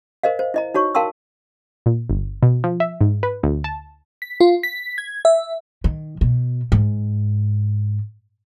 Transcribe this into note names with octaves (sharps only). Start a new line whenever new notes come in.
A#4 C5 D#5 F5
C5
E4 D#5 A#5
D#4 F#4 C#5 C#6
A#4 F5 G5 A5 C6 E6
A#2
G1
B2
F3
E5
G#2
B4
D2
A5
B6
F4
B6
G#6
E5
D#3
B2
G#2